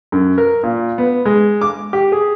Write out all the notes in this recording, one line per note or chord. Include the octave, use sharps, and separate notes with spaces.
F#2
A#4
A#2
B3
G#3
D6
G4
G#4